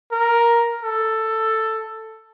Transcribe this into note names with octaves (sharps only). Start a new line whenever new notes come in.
A#4
A4